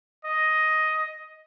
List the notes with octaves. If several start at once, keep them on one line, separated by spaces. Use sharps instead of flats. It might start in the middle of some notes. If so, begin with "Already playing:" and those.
D#5